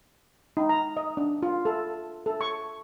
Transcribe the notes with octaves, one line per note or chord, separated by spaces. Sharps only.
D#4
A#5
D#5
D4
F4
A4
A4
C#6